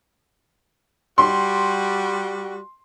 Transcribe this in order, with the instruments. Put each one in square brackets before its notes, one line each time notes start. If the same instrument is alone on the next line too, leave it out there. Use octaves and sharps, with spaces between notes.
[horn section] G3 F#4 [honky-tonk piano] C6